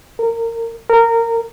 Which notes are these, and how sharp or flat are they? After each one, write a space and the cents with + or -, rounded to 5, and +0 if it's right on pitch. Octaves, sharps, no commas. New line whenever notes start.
A#4 -25
A#4 -20